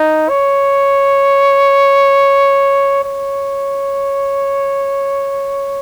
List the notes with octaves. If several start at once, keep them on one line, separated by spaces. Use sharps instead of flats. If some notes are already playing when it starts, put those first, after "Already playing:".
Already playing: D#4
C#5
C#5